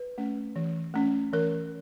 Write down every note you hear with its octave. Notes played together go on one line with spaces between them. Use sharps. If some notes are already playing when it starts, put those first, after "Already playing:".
Already playing: B4
A3 C#4
E3
A3 C#4
E3 A#4